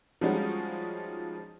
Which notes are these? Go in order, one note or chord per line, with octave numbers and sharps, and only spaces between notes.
F3 G3 G#3 C#4 D#4 F#4